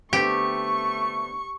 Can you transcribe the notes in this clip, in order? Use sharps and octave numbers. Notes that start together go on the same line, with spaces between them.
D3 A3 B3 C4 G4 C#6